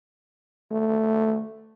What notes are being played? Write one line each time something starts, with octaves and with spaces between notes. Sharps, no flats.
A3